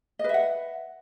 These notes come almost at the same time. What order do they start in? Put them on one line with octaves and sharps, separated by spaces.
D#5 B4 E5 F#5